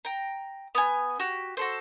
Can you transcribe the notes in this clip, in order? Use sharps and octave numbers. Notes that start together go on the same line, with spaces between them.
G5 A#5
B3 G#5
F#4 G4
F#4 A4 C5